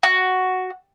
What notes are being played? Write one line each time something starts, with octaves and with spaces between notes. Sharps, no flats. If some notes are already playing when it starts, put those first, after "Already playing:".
F#4